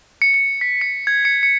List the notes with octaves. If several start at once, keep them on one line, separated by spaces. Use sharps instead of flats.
C#7
C#7
B6
C#7
G#6
C#7
C#7